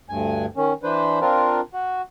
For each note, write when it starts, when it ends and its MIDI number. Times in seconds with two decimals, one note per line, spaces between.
0.09 0.46 38
0.09 0.46 43
0.09 0.46 80
0.57 0.73 51
0.57 0.73 61
0.83 1.19 52
0.83 1.19 62
0.83 1.19 71
0.83 1.19 72
1.21 1.60 60
1.21 1.60 62
1.21 1.60 65
1.21 1.60 70
1.73 2.02 66